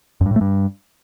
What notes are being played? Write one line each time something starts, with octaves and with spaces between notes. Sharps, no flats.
F#2
G2
A2
A3
G2